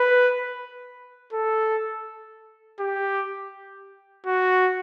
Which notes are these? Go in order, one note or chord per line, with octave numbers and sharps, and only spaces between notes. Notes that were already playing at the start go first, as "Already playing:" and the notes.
Already playing: B4
A4
G4
F#4